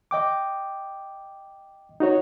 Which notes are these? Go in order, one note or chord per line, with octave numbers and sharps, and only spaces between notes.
D#5 G5 D6
D#4 F#4 C#5